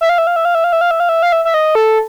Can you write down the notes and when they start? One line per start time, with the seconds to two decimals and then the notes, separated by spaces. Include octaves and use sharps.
0.01 E5
0.09 F5
0.18 E5
0.27 F5
0.36 E5
0.45 F5
0.55 E5
0.64 F5
0.73 E5
0.81 F5
0.91 E5
1.00 F5
1.09 E5
1.23 F5
1.32 E5
1.45 E5
1.54 D#5
1.75 A4